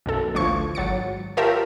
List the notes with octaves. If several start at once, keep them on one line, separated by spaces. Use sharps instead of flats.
B1 F#2 A4
A1 D2 F3 C#6 G#6
G#1 F#3 A6 C#7
F4 G4 A#4 C#5 E5 A5